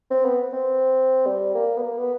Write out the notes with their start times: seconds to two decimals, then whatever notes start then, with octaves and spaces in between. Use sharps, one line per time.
0.11 C4
0.25 B3
0.53 C4
1.26 G3
1.55 A#3
1.77 B3
1.83 A#3
1.98 B3